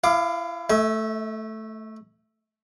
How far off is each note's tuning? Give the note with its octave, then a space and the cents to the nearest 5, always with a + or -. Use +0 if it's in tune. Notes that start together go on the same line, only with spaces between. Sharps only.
E4 +35 F5 +0 D6 +20
A3 +0 E5 -45 G#5 +5